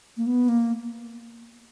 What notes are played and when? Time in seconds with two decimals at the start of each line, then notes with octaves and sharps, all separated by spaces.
0.17 A#3
0.27 B3
0.49 A#3